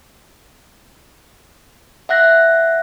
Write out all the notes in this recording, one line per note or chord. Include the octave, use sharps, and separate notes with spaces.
E5 F#5 F#6 A#6